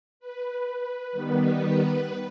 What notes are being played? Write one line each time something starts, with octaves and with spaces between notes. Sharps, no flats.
B4
D#3 G3 B3